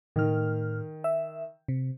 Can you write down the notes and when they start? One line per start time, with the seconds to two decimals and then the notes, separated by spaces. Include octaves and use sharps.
0.16 A2 D#3 F6
1.04 E5
1.68 C3